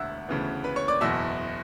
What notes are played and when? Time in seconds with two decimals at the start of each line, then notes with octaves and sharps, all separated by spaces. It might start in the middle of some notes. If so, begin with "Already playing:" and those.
Already playing: E1 D2 D3 E5 F#5 E6 F#6
0.28 D2 C#3 E3 B3
0.64 B4 B5
0.76 C#5 C#6
0.88 D5 D6
1.01 F#1 E2 B2 E5 E6